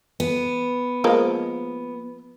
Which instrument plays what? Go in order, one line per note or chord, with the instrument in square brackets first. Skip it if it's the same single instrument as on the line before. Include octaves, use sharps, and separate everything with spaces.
[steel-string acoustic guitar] B3
[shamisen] F3 G#3 A#3